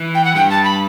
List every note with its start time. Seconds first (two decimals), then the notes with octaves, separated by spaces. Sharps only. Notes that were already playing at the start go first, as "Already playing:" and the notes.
Already playing: E3
0.14 G5
0.24 F#5
0.35 G2 G3 G5
0.50 A5
0.64 B5